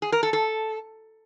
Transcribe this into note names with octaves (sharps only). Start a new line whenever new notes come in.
G#4
A#4
A4
A4